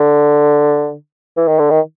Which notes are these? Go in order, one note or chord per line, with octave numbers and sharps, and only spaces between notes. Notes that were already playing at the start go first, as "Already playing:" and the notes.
Already playing: D3
E3
D#3
D3
D#3